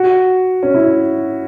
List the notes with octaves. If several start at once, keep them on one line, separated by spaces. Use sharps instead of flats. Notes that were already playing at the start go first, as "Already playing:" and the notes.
Already playing: F#4
C#4
E4